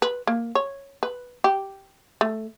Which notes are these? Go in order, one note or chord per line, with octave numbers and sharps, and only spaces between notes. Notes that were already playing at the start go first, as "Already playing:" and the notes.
B4
A#3
C#5
B4
G4
A3